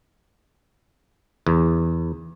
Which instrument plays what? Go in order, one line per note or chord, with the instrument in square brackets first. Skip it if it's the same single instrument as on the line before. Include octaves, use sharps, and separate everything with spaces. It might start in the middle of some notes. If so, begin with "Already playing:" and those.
[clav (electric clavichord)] E2